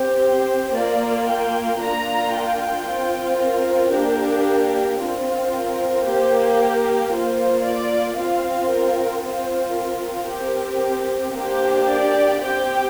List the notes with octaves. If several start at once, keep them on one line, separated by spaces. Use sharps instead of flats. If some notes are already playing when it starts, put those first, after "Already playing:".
Already playing: C4 G4
C5
A#3 F4 D5
G5
A#3 D4 F4 A#5
G5
C4 F4
A#4
A#3 D4 G4
C4 F4
A#4
A#3 G4 C5
A#4
A#3 F4 C5
D5
C4 F4 F5
A#4
C4 F4 C5
A#4
C4 G4
A#3 D4 G4 C5
D5
C4 G4 G5